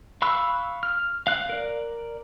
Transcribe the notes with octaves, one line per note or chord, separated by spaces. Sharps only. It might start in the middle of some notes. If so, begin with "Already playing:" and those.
F5 B5 C#6 E6 F#6
F6
F5 F#6
A#4 D5